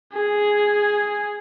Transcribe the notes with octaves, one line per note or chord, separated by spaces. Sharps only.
G#4